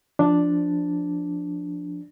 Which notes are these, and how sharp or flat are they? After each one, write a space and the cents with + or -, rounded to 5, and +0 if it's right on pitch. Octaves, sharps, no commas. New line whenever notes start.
F3 +0 D4 +0